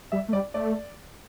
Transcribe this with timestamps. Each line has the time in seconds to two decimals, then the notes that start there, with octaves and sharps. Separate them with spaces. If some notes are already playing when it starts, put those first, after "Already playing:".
0.12 G3 E5
0.28 A3
0.33 G3 D5
0.54 A3 D5